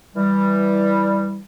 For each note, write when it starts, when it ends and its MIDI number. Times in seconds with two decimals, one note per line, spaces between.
0.16 1.40 52
0.16 1.40 55